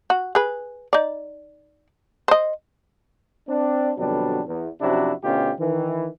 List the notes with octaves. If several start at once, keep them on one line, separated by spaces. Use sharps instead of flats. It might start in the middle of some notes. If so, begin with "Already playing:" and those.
F#4
G#4 B4
D#4 D5
C5 D#5
C4 D4
F2 B2 D3 F#3 G3 D4
E2
F#2 C3 F3 D4 E4 F#4
D2 B2 C#4 D#4 F4 G4
D#3 E3